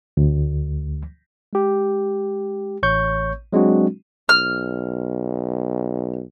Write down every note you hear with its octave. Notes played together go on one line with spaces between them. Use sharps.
D2
G#3 G4
A1 C#5 C#6 G6
F#3 G#3 C4 D4 F#4
B1 F6